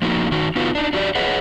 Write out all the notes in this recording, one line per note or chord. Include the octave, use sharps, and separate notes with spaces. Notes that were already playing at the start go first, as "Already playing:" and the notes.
F3 A3 A#3 D#4 E4 F#4
D#3 D#4 F#4
B3 D#4 F4 F#4 B4 F5
D4 D#4
D4 F#4 G4 D5
G#4 B4 C#5 D#5 F#5